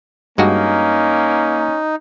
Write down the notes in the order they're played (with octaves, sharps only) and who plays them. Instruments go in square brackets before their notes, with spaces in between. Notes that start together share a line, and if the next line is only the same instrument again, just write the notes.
[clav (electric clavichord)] G2 G#3 F#4 [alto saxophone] A#3 [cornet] C#4 [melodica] D#4